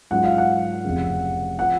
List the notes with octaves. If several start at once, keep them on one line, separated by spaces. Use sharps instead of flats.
G#2 F#3 C#4 F4 F#5
F5
F#5
F1 F2 C#3
F3 F#5